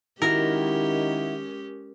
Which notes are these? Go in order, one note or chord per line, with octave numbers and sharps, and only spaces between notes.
D#3 G#3 C#4 E4 F#4 G4 A#4